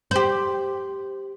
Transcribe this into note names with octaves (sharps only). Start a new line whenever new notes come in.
G4 C5